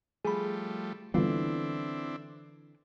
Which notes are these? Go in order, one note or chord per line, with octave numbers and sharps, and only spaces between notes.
F3 G3 A3 G#4 B5
D3 E3 G3 B3 C4 D4 E4 F4